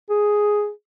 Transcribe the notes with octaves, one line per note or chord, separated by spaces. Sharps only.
G#4